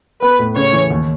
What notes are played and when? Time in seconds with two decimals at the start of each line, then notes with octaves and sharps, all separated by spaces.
0.22 B3 B4
0.39 A2
0.56 C#3 C#5
0.73 E3
0.90 D#2